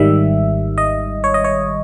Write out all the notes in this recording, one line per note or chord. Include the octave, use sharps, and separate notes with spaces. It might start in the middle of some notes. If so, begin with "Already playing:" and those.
Already playing: G#1 G#2 D#3 G3 E5
D#5
C#5
D#5
C#5